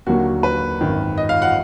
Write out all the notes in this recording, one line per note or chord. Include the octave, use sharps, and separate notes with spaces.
D#2 D3 F#3 A#3 F#4
B4
G#1 F#2 D#3
D#5
F5
F#5